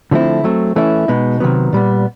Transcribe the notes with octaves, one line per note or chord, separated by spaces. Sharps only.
D3 F3 A3 C4 E4
F#3 A3 C4
E3 A3 C#4 E4
B2 G#3 B3 D#4
C3 D#3 F#3 B3
A#2 G3 B3